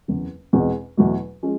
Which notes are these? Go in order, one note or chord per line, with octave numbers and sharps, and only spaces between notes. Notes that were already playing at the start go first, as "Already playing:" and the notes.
F#1 E2 C#3
E2 B2 G#3 C4
E2 B2 F#3 A3
F3 G#3 C#4